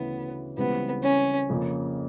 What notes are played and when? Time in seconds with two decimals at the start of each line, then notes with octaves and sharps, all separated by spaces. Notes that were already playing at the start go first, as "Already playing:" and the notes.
Already playing: D2 C#3 E3 B3
0.57 C#2 C#3 E3 G3 B3 C4
1.03 C#4
1.49 F2 C#3 F3 A#3